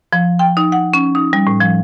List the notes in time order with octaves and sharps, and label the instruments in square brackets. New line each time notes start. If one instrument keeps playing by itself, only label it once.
[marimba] F3
G5
D#4
F#5
C#4
D#4
G3
A2
F3